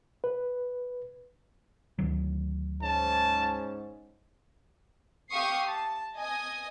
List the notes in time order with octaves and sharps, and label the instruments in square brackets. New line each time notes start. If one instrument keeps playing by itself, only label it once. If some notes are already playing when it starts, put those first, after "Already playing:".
[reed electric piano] B4
[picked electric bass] D2 D#3 F#3
[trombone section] G#2 C#4 [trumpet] A5
[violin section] G4 E5 F5 C#6 D#6 C7
A5
D#5 G#5 D#6